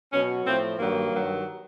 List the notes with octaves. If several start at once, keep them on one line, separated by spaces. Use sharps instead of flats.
B2 F#3 C#4
A2 F3 C4
G2 D#3 F#3 A#3
G2 D#3 F#3